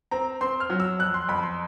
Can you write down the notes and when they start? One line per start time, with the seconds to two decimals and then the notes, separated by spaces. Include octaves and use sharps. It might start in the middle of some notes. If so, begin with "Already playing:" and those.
0.11 C4 A#5
0.41 C4 C6
0.60 F6
0.70 F#3
0.80 E6
0.99 F2 F#6
1.14 C6
1.29 F2 B5
1.43 C6